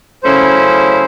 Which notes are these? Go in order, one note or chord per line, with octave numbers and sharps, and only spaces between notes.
C#3 F#3 A3 C#4 E4 C5